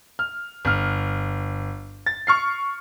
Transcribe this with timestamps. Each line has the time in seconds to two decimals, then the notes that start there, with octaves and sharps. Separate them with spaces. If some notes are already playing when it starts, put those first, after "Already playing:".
0.19 F6
0.65 G1 F6
2.06 A6
2.27 C#6 F6 C7